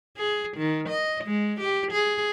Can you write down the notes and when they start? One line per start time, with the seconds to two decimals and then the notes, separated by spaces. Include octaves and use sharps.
0.17 G#4
0.57 D#3
0.89 D#5
1.24 G#3
1.60 G4
1.91 G#4